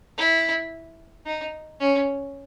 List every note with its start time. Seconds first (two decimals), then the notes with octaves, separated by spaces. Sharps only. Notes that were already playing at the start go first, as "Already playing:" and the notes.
0.17 E4
1.26 D#4
1.80 C#4